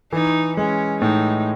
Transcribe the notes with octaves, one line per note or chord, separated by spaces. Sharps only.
E3 D#4
G#3 C#4
A2 D#4